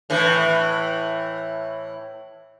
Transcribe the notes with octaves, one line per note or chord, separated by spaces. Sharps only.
A2 E3